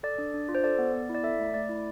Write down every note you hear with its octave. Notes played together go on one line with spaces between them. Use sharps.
A4 D5
D4
D4
F4
C5
A4 D5
B3
B3
E4
D5
A4 E5
A3
A3 D5
E4